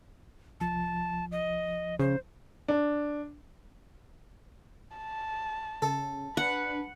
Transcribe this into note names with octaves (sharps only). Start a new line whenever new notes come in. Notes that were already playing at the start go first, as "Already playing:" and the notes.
C2 F3 A5
D#5
C#3 C5
D4
A5
C#3 A4
D4 B4 F#5